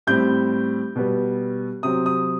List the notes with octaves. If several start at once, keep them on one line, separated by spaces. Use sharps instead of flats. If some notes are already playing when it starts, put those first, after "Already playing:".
A2 G3 C4 G6
B2 G3 B3
C3 F#3 C4 D#6
D#6